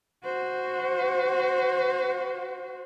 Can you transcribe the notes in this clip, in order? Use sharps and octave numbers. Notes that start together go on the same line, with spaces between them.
F#4 C5